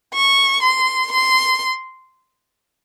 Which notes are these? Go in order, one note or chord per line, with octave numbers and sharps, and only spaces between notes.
C#6
C6
C6